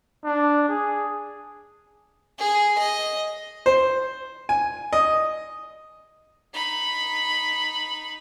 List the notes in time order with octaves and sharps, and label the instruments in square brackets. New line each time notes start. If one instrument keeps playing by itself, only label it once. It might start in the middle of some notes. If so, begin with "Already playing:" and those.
[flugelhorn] D4
G#4
[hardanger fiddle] G#4
D#5
[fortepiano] C5
G#5
D#5
[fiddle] D#4 B5